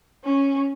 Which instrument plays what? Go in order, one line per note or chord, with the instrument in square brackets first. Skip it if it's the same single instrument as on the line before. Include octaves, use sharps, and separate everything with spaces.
[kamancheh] C#4